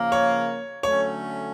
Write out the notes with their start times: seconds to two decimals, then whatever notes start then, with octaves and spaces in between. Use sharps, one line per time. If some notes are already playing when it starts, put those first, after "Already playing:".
Already playing: C#3 F3 A#3
0.12 C#5
0.83 D3 F#3 A3 C#4 C#5